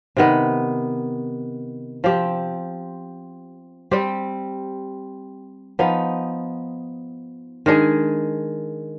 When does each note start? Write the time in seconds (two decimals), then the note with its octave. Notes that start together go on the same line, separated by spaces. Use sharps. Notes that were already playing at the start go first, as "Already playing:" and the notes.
0.16 C3 D#3 B3
2.04 F3 C4 G4
3.91 G3 C4 G4
5.79 F3 B3 D#4
7.66 D#3 G#3 D4 G#4